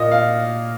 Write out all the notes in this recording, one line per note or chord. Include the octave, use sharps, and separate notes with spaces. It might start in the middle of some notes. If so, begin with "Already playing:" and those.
Already playing: A#2 A#3 D#5
F5